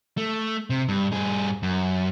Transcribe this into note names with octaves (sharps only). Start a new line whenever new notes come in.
A3
C3
G2
G2 G#4
F#2